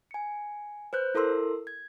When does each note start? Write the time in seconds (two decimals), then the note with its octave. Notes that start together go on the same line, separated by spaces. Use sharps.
0.11 G#5 C#7
0.93 B4 C5 F#6 G6
1.15 E4 A4 A#4 C6 E6
1.67 G#6